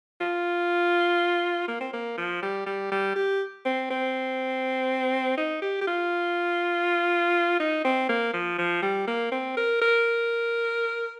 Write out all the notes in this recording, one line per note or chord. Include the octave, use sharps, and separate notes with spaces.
F4
A#3
C4
A#3
F3
G3
G3
G3
G4
C4
C4
D#4
G4
G4
F4
D#4
C4
A#3
F3
F3
G3
A#3
C4
A#4
A#4